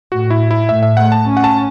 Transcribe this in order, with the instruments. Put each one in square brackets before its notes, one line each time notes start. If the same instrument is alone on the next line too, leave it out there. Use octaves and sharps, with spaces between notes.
[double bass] A2 [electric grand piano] F#4
[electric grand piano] E4
E4
[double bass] A2 [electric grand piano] E5
[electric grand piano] E5
[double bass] A3 [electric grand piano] F#5
[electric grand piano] A5
[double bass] C#4
[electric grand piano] F#5
A5